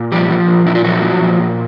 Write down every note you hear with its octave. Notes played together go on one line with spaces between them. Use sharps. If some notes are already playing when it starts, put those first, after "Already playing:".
Already playing: A#2
F3 G3 G4
F3
A#2
A#2 E4
F4
F3 F#3 F#4
F3
A#2
A#2